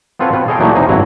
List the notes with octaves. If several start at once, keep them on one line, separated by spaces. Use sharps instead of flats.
B3 C4 F4 A4 B4 C#5
B2 C4 F4 B4
G#4 A4 C#5 D#5 F5 G5
A#2 E3 F#3 A3 A#3 D#4
E2 C3 D#4 G#4 G#5
G#1 G2 F#3 E4 A#5